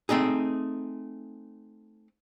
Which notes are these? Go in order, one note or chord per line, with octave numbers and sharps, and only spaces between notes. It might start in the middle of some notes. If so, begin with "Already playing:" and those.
A3 C4 D#4 G#4